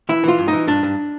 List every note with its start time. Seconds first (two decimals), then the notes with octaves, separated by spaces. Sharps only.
0.09 E3 E4
0.24 E3 F4
0.38 G2
0.48 E3 D#4
0.67 G2 D4
0.83 G2